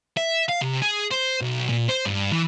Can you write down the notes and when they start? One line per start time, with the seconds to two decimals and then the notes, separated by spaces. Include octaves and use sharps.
0.17 E5
0.49 F5
0.61 C3
0.82 G#4
1.11 C5
1.41 B1
1.69 A#2
1.89 C5
2.06 G2
2.32 E3